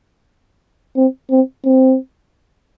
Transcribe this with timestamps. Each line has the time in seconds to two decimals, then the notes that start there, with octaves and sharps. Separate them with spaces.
0.96 C4
1.31 C4
1.65 C4